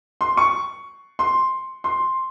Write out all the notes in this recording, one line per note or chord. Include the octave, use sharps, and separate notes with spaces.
C6
C#6
C6
C6